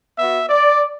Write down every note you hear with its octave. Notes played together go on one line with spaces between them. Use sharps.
B3 F#4 E5
D5